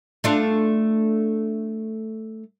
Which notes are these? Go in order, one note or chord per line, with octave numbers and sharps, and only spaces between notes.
A3 D4 F4